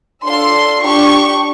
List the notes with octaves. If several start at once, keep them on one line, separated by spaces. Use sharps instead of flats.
D4 F4 A4 C6
D4 G4 C#6